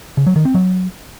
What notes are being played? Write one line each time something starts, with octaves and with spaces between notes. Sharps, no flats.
C#3
F#3
D#3
C4
F#3